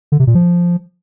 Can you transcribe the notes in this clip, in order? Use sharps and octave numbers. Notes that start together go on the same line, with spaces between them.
D3
C3
A#2
F3